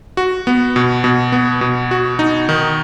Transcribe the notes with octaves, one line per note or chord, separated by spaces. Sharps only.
F#4
B3
B2
B2
B3
B2
F#4
D#4
D#3